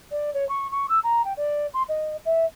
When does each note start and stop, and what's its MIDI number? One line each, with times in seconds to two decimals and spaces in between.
0.11 0.33 74
0.34 0.47 73
0.49 0.69 85
0.71 0.86 85
0.89 0.99 88
1.04 1.24 82
1.25 1.33 79
1.37 1.67 74
1.74 1.83 84
1.89 2.16 75
2.25 2.45 76